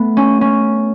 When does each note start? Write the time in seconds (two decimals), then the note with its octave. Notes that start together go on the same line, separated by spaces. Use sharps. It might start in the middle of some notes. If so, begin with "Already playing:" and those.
Already playing: A3 B3
0.17 C#4
0.41 C#4